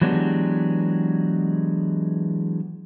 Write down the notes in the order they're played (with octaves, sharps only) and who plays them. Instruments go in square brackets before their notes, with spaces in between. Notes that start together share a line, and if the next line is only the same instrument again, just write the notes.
[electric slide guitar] E3 F#3 G#3 B3 D4 G4